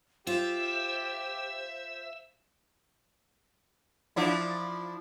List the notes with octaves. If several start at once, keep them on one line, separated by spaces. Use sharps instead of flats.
F4 G4 C5 E5
F3 D4 E4